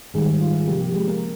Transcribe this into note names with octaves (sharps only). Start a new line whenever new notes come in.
G#2 D#3 G3 G#3 G#4
F4
C3 F3 A#3 G4
G4
G#3 G#4
A#3 A#4